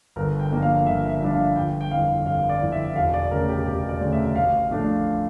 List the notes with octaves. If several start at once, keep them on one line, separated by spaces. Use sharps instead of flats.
G1 A#4
G5
G2 F3 A#3 D4
F5
G1 E5
E5
G2 F3 A#3 D4 E5
F5
G1 G5
G5
F2 E3 F5
G1 F5
D5
F2 E3
E5
E1 F5
D5
D2 C#3 A#4
G4
E1 G4
D5
D2 C#3
E5
A1 F5
A2 F3 A3 D4